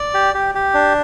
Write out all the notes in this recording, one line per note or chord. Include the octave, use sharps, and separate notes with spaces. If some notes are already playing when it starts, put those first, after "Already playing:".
Already playing: D5
G4
G4
G4
D4